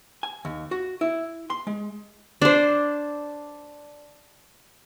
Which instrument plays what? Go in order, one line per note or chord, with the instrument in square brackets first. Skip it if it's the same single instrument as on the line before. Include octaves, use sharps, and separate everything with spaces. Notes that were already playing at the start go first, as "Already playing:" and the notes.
[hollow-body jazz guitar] G#5
D#2
F#4
E4
C6
G#3
[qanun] D4 C5